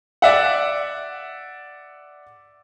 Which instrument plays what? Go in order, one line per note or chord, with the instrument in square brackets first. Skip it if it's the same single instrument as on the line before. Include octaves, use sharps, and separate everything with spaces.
[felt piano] D5 E5 F#5